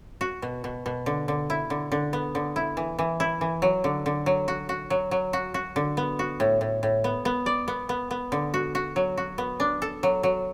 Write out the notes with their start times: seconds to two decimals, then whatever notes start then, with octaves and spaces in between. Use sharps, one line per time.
0.21 F#4
0.42 B2
0.64 B2
0.86 B2
1.06 D3
1.28 D3
1.50 E4
1.70 D3
1.92 D3
2.13 B3
2.35 D3
2.56 E4
2.77 E3
2.99 E3
3.20 E4
3.41 E3
3.62 F#3
3.84 D3
4.06 D3
4.26 F#3
4.48 F#4
4.69 F#4
4.90 F#3
5.11 F#3
5.33 F#4
5.54 F#4
5.76 D3
5.97 B3
6.19 F#4
6.40 A2
6.61 A2
6.83 A2
7.04 B3
7.25 B3
7.46 D5
7.68 B3
7.89 B3
8.11 B3
8.32 D3
8.54 F#4
8.75 F#4
8.96 F#3
9.17 F#4
9.38 B3
9.60 D4
9.82 A4
10.03 F#3
10.23 F#3